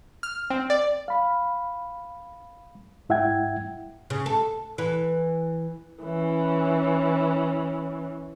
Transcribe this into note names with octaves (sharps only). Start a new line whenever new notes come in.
F6
C4
D5
F5 B5
G#2 E4 E5 F#5 G5 G#6
C#3
A4
E3
E3 C#4